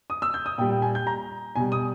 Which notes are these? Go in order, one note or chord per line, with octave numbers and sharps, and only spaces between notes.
D#6
E6
G6
D#6
A#2 G3 G5
G5
G#5
G6
A#5
B2 G3 G#5
D#6